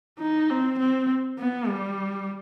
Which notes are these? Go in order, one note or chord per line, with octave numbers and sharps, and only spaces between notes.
D#4
C4
C4
B3
G3